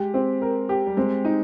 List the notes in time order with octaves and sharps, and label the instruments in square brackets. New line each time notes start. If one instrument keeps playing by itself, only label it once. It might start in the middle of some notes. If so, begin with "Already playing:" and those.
Already playing: [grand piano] G#3 [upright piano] G4
[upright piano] C4
A#4
G4
[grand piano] G3
[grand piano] G#3 [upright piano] C4
[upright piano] D#4